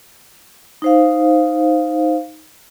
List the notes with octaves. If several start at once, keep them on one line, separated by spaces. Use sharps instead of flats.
D#4 C5 F5